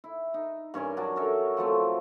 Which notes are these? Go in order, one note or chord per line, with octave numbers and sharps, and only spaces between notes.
E4
D#4
G2 C#4 A#4 G#5
F#3 D4
C#4 A4 A#4 E5
F3 F#3 A3 C4